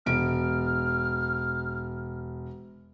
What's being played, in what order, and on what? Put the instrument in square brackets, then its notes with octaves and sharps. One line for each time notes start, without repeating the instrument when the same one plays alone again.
[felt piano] E1 D7 [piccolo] F6